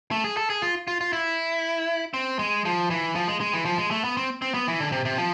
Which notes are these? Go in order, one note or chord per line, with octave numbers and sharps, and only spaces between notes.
A3
G#4
A4
G#4
F4
F4
F4
E4
C4
G#3
F3
E3
F3
G#3
G#3
E3
F3
G#3
A3
B3
C4
C4
B3
E3
D3
C3
C3
F3